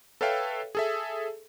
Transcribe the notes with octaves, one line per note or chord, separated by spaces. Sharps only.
A4 B4 C#5 E5 F5 G5
G#4 A4 E5